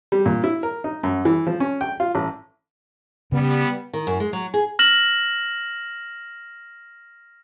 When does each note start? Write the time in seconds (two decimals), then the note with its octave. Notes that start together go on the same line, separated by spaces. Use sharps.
0.12 G3
0.26 A#2
0.44 E4
0.63 A#4
0.84 D#4
1.03 F#2
1.25 E3
1.47 F3
1.60 C#4
1.81 G5
2.00 F4
2.15 A1
3.32 C#3 G3 B3
3.93 D#3
4.07 F#2
4.20 G#3
4.33 F#3
4.54 G#4
4.79 F6 A#6 E7 F#7